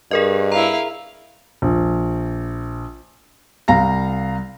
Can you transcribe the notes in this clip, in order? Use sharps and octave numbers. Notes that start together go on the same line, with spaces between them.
G2 G#4 A#4 D#5
E4 F5 A#5
A#1
C2 F5 A#5 A#6